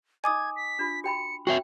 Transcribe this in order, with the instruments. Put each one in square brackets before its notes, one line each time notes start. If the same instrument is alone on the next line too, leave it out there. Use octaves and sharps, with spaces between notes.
[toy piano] D#4 D#5 [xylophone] G#5 D6 D#6 [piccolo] G#6
[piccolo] B6
[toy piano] D4 F4
[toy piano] F#4 G5 B5 [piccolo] C#7
[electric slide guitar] F#4 C#5 E5 [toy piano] G5 [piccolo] C7